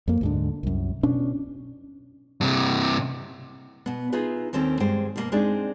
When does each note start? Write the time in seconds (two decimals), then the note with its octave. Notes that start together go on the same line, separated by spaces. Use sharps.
0.08 F2 A#3
0.21 D2 G#2 D3
0.63 C2 F#2
1.03 B2 C#4 D4
2.41 G2 C3
3.86 B2 B3
4.12 D#4 F4 G#4 B4 E5
4.53 D#2 D#3 C4 C#4 A4
4.80 G2 G#3 C5 G5
5.16 B2 D3 A#3
5.32 G#3 C4 D4 D#4 G#4 D5